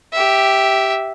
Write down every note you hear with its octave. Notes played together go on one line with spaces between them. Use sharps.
G4 E5